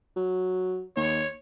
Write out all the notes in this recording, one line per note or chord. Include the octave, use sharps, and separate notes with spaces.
F#3
D#2 C#5